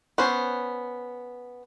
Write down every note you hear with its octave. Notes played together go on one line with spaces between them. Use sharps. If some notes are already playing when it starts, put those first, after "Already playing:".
B3 C#4 C5